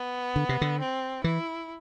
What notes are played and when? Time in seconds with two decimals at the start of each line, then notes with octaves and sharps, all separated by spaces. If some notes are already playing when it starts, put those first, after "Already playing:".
Already playing: B3
0.36 D3
0.49 C3
0.61 D3
0.80 C4
1.24 E3 E4